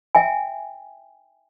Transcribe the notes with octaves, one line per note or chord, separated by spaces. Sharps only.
E5 G5 G#5